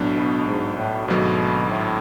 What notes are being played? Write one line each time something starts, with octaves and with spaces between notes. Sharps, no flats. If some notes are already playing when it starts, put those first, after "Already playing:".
Already playing: B1 A2 F#3 B3 D4
B2
G#2
A2
G#1 G#2 B2 F#3 A3
A2